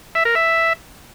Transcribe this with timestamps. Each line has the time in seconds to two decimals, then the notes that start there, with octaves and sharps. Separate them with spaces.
0.15 E5
0.25 A#4
0.35 E5